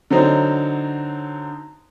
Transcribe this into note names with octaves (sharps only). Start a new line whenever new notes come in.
D3 F#3 C4 D#4